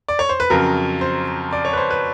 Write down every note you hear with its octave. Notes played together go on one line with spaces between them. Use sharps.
D5
C#5
C5
B4
F2 C#3 F#3 A#4
C5
D5
C#5
B4
C5
B4